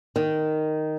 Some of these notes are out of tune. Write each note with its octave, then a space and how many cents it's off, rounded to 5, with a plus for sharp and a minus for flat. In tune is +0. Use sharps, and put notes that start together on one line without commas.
D#3 -5